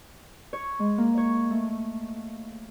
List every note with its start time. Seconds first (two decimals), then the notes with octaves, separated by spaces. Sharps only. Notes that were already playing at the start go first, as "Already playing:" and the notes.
0.53 C#5
0.79 G#3
0.98 A#3
1.18 C#5
1.51 A3